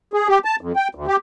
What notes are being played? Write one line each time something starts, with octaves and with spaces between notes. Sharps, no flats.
G#4
G4
A5
F2
G5
D2
G4